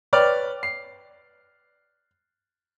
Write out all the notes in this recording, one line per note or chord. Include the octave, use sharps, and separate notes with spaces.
B4 C#5 D5 G5 D6 F6
C7